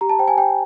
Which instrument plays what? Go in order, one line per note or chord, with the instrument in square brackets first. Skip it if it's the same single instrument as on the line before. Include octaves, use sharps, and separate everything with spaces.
[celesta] G4 A#5
A5
C5 G5
G#5
G4 G5